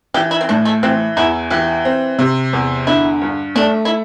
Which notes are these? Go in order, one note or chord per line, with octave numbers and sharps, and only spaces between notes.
E3 G4
E4
C4
A2 D4
A3
E3 C4
E2 E4
E3 G4
C4
C3
E2
D3 E4
G2
A3 D4
E4